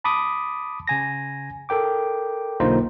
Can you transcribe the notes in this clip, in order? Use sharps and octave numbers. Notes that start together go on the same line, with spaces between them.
A5 B5 D6 D#6
C#3 G#5 A#6
A4 A#4 G5 D6
B1 D3 A#3 D#4 F4 C5